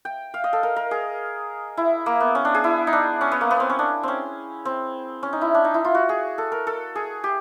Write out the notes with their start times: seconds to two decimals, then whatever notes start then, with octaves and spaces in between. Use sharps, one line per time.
0.05 G5
0.34 F5
0.44 D#5
0.53 A4
0.63 A#4
0.76 A#4
0.91 G#4
1.77 E4
2.06 A#3
2.20 B3
2.35 C#4
2.45 D4
2.55 G#4
2.64 E4
2.87 D#4
2.93 D4
3.21 C#4
3.32 B3
3.41 A#3
3.51 B3
3.60 C4
3.69 C#4
3.79 D4
4.03 C4 C#4
4.65 C4
5.23 C#4
5.33 D#4
5.41 E4
5.54 D4
5.64 D#4
5.74 E4
5.85 F4
5.95 F#4
6.09 G#4
6.38 A4
6.52 A#4
6.67 A4
6.95 G#4
7.24 G4